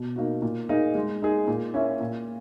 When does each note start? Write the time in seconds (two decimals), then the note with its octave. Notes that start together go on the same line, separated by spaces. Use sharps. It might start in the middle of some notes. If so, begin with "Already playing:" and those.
Already playing: B2
0.16 A#3 D#4 F#4
0.42 A#2
0.69 A#3 D#4 G#4
0.95 G#3
1.22 D#4 G#4
1.48 A#2
1.73 A#3 C#4 E4
2.01 A#2